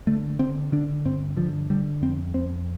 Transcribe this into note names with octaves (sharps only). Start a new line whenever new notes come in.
D3 A3
D3 C4
D3 D4
G2 C4
D3 F3
D3 G3
F2 C4
F2 C4